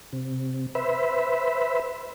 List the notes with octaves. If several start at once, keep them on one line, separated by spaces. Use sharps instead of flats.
C3
B4 C5 E5